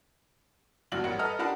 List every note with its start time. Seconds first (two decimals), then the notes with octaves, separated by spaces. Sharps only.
0.92 F1 G2 F#4 F#7
1.04 A1 G3 A#4 F#5 C#7
1.19 A4 B4 D#5 A#5 D#6 F6
1.39 D4 G4 A#4 F#5 A5 B5